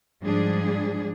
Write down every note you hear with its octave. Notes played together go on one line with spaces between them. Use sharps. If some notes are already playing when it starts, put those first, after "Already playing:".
G#2 F3 G3 D4 G#4